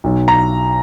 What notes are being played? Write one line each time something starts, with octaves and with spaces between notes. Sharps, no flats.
B1
A#5